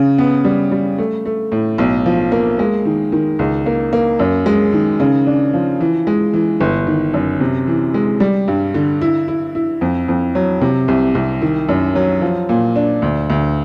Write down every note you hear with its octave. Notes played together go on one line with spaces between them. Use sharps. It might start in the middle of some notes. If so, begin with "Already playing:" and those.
Already playing: C#3
B3
G3
G3
A3
A3
A2
B1
F3
A#3
G#3
D#3
D#3
C#2
A#3
A#3
F#2
G#3
D#3
C#3
D4
F3
E3
G#3
E3
G1
D#3
F#2
C3
E3
G#3
G3
G2
D3
E4
E4
E4
F2
F2
F#3
C3
C2
C2
D#3
F#2
F#3
F3
A#2
D4
D2
D2